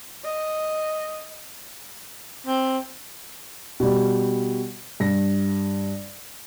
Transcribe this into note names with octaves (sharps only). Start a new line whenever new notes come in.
D#5
C4
B2 G3
G2 A#6